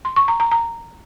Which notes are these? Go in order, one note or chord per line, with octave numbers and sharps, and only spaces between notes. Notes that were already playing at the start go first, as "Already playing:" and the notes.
C6
C#6
A#5
A#5
A#5